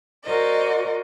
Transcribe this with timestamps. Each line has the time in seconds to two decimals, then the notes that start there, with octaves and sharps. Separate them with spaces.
0.24 F#4 A#4 C5 D5 D#5